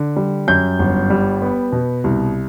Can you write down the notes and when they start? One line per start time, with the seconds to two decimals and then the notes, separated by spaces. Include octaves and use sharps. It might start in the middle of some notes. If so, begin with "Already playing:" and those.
Already playing: D3
0.16 G3
0.48 F#2 G6
0.79 G1
1.10 G3
1.42 B3
1.72 B2
2.04 C2